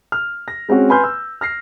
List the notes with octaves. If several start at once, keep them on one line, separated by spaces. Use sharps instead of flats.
F6
A#6
G#3 C4 C#4 F#4
B4 G#5 B5 C6 F6 G6
E6
F6 A#6 C7